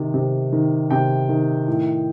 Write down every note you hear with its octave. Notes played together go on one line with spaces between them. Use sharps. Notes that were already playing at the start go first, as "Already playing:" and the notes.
Already playing: C3 D#3
C3
D#3
C3 G5
D#3
A2